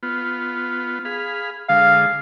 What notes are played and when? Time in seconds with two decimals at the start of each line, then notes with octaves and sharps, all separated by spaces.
0.03 B3 F4
1.05 G#4 F5 B5
1.69 D3 G#3 F5